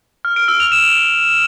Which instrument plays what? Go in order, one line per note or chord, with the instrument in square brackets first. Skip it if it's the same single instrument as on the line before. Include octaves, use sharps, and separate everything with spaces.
[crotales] F6
D7
E6
F7
E7